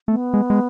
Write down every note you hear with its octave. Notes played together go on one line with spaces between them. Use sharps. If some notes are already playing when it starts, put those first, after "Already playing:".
A3 B3
G#3
G#3